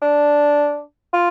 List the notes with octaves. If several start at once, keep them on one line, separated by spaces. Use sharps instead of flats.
D4
F4